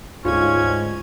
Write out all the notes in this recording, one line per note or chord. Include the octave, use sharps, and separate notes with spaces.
D2 G#2 C#4 F4 G#6